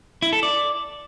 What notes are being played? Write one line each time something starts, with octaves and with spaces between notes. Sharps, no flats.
E4
A4
D5